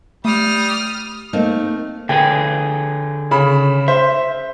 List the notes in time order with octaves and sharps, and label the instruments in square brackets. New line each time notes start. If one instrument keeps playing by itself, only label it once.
[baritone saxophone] G3 [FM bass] A3 [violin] D#6 F6
[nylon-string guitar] A3 A#3 C4 D#4
[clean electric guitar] D3 G#4 B4 [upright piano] G5
[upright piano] C#3 B5
[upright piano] C5 [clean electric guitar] E5